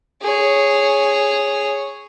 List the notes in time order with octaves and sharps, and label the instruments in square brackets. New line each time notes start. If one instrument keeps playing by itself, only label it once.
[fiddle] G#4 C#5